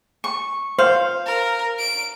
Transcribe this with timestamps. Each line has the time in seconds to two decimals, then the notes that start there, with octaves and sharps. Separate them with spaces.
0.24 C#6
0.79 C5 F5
1.26 A#4
1.79 D7